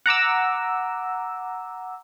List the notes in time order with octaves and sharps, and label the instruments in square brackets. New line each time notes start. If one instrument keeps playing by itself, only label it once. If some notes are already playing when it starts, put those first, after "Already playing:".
[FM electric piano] F#5 A#5 D6 E6